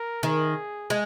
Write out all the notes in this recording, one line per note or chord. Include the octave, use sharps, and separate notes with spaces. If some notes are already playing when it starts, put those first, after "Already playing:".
Already playing: A#4
D#3 G#4
G#3